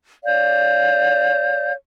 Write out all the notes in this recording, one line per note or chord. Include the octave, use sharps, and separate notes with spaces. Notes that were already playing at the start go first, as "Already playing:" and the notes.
C#5 D5 F5 G6